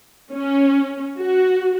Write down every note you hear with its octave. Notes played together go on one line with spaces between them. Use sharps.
C#4
F#4